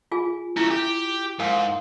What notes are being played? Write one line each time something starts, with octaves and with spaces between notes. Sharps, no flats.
F4 G#4 G#5
A3 C#4 E4
G4
G#2 A#4 F5 G#5